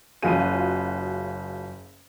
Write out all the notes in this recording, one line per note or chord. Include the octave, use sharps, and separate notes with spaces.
F#1 C#3 F4 F#4 G#4 D#7